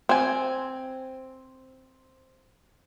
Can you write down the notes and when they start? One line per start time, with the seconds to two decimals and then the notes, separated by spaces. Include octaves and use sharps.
0.09 C4 G#5